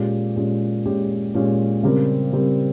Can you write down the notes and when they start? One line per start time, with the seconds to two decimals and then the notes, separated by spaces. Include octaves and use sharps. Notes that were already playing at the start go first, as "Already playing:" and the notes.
Already playing: A#2 G#3 C#4 G4
0.36 A#2 G#3 C#4 G4
0.86 A#2 G#3 C#4 G4
1.35 A#2 G#3 C#4 G4
1.83 C#3 G3 C4 G4 A#4
2.32 C#3 G3 C4 G4 A#4